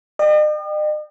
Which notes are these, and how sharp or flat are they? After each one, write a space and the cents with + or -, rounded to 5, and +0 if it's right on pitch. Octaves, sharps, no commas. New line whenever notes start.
D#5 -45 G5 +0